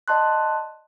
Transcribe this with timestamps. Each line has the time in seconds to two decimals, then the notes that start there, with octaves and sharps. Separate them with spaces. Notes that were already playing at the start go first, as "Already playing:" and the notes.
0.08 D5 D#5 A5 C6 F#6